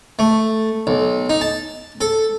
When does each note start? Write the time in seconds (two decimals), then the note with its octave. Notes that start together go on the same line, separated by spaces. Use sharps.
0.19 A3
0.87 B1
1.29 D#4
1.41 A5
2.01 A4